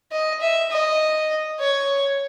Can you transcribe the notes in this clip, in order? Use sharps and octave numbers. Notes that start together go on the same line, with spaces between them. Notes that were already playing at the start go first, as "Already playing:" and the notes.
D#5
E5
D#5
C#5